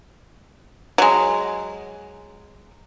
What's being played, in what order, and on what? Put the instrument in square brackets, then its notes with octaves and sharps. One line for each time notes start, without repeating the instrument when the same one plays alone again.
[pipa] F#3 G#3